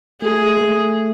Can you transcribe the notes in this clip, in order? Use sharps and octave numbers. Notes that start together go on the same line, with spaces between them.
A3 G#4
A3